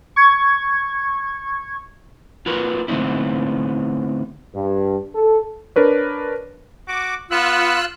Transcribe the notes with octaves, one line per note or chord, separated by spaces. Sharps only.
C#6 G#6
F4 F#4 A#4 B4
D3 A3 B3 C4 D#4 E4
G2
A4
D4 A#4 B4 C#5
F#4 D6
B3 F4 E6 F#6